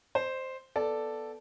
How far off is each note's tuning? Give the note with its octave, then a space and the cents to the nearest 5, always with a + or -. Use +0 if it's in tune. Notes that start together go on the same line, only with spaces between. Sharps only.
C5 +0 D#5 -45
B3 +0 A4 +0 D5 +0